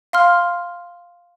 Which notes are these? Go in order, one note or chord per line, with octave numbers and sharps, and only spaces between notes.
F5 C6 F6